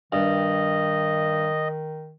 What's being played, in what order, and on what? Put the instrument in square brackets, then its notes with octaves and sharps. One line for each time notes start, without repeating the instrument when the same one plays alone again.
[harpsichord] G2 [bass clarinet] D#3 [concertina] D#5